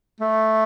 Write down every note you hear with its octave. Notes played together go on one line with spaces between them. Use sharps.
A3